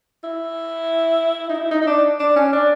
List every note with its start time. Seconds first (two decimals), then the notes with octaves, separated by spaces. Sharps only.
0.24 E4
1.49 D#4
1.54 E4
1.71 D#4
1.82 D#4
1.87 D4
2.20 D4
2.36 C#4
2.53 D4